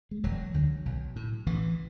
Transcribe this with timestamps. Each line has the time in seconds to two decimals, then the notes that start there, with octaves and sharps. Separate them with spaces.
0.11 G#3
0.24 E1 F#3
0.54 D2 D3
0.86 B1
1.16 A2
1.46 A1 E3